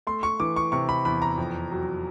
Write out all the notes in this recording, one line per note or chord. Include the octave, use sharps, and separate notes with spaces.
A3 C6
C#6
E3 D6
C#6
C3 C#6
B5
E2 B5
A#5
F2
F#3